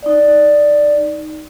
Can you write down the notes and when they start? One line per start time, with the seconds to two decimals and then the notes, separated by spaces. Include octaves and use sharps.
0.03 D#4 D5